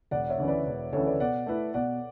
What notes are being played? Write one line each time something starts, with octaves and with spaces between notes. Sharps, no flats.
E1 D5 F#5
C#5 E5
D2 C#3 E3
B4 D5
E1
D2 C#3 E3 A4 C#5
B4 D5
B2 D5 F#5
A3 E4 B4
B2 D5 F#5